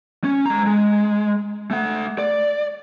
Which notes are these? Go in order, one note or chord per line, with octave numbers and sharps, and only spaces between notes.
C#4
G#3 A#5
G#3
A3 F#5
D5